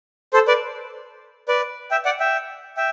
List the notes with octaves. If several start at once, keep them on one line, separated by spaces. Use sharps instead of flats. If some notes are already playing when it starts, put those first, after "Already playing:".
A4 C5
B4 D5
B4 D5
E5 G5
D5 F#5
E5 G5
E5 G5